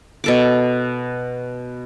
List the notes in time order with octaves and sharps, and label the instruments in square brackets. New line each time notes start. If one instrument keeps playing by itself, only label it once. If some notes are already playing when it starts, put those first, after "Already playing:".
[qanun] B2 A4 D6